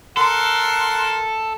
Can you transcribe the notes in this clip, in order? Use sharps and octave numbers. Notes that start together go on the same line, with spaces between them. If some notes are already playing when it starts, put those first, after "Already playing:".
A4 A#4 F#5 C6